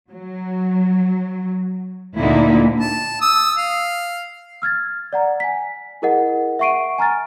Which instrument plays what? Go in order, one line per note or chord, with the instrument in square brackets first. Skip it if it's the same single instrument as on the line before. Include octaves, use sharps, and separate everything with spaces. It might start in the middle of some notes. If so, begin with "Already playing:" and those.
[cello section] F#3
D2 A#2 D3 A#3 D#4 E4
[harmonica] A5
D#6 E6
F5
[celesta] E6 F6 G#6 A6
D5 F#5 A#5
G#5 B6
E4 G#4 A#4 D#5 F#5
E5 F#5 C#6 C7 D7 D#7
G#5 A#5 F6 A6